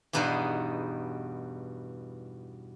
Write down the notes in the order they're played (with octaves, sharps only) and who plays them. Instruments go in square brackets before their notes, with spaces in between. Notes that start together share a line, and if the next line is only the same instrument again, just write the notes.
[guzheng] E2 G2 B2 B3 D#4 G#4